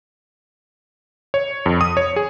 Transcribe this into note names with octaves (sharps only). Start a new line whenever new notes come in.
C#5
F2
D#6
C#5
G#4